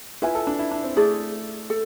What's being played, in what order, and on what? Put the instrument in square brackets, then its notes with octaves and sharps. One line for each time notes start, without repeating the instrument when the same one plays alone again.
[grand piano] E4 [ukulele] F4 B4 E5 G#5
[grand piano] A4
D4
E4
D4
C4
[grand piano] A3 [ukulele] E4 G#4 D5
[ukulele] A4